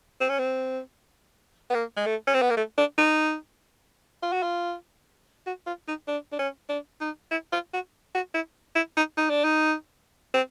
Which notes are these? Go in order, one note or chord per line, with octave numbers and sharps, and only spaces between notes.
C4
C#4
C4
B3
A#3
G#3
A3
C#4
C4
B3
A#3
A3
D4
D#4
F4
F#4
F4
F#4
F4
D#4
D4
D4
C#4
D4
D#4
E4
F4
F#4
F#4
E4
E4
D#4
D#4
D4
D#4
C4